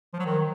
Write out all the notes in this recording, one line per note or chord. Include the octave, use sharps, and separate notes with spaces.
F3
F#3
D#3